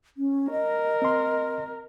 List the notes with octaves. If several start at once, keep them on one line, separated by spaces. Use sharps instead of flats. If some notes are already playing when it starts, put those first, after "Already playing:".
C#4
A#4 D#5
C4 C6